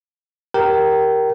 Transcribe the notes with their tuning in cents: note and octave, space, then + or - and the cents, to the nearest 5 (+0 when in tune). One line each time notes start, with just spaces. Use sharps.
G4 +0 A#4 +0 G5 -25